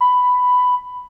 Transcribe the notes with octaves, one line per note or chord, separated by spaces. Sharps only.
B5